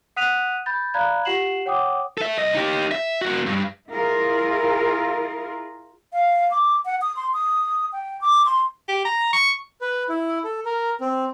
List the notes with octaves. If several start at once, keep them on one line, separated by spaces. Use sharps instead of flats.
F#5 D#6 F#6 B6 D#7 F7
B5 G6 A6
D5 F5 A#5 B5 F#6 G#6
F4 G4 F#5 C7 E7 F#7
C#5 F#5 G5 D6 D#6
A4 E5
C2 D#5
D#4 G4
E5
A#3 F#4
G2
E4 F4 G#4 A#4
F5
D6
F#5
D#6
C6
D#6
G5
D6
C6
G4
A#5
C#6
B4
E4
A4
A#4
C4